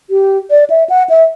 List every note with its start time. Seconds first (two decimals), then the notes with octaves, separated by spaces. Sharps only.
0.10 G4
0.50 D5
0.70 E5
0.90 F#5
1.10 E5